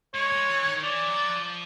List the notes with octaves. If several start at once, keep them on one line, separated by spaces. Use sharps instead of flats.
G#3 C#5
G#3
E3
D#3
E3 D5
F#3
F3